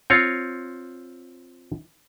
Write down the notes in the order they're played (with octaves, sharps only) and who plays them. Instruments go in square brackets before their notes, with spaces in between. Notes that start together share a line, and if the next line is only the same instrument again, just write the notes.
[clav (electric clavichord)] C4 F4 C#5